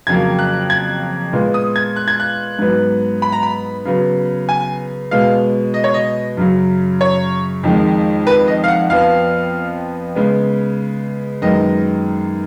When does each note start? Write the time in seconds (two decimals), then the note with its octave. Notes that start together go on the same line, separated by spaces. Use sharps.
0.07 F2 C#3 F#3 A#3 G#6
0.39 F#6
0.70 G#6
1.33 A#2 G#3 B3
1.54 D#6
1.76 G#6
1.96 F#6
2.08 G#6
2.20 F#6
2.59 G#2 F#3 B3
3.22 B5
3.32 A#5
3.43 B5
3.85 C#3 F#3 B3
4.49 G#5
5.11 B2 G#3 B3 F5
5.74 D#5
5.84 C#5
5.94 D#5
6.37 F#2 C#3 F#3
7.01 C#5
7.63 F2 D#3 G#3
8.27 B4
8.47 D#5
8.64 F5
8.68 F#5
8.90 F2 F3 B3 F5
10.16 C#3 G#3 B3
11.42 F#2 D#3 G#3 B3 D#5